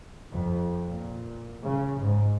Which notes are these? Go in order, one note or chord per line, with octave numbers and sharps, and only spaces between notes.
F2
A#2
C#3
G#2